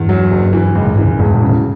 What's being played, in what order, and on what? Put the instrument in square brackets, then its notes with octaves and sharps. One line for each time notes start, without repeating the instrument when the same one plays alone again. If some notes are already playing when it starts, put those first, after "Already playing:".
Already playing: [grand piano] E2 [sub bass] G2
[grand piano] F#3
F#1
E3
[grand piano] C#2 [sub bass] F#2
[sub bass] G2
[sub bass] F#2 [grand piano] E3
[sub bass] F#2
[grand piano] E1 [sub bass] G2
[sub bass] A2
[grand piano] C#3
[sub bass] A2